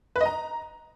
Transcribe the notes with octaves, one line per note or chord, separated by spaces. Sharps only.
B4
D#5
A#5